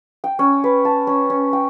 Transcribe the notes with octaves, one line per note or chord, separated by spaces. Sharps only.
G5
C#4
B4
A5
C#4
C#4
G5